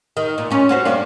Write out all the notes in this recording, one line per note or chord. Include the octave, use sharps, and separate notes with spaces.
D#3
A#2
A#2 C#4
C#4 F#4 C5
G2 A#3 D4